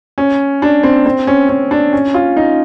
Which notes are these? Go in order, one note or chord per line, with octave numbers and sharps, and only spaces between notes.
C#4
D4
C4
C4
C#4
C#4
D4
C#4
F4
D#4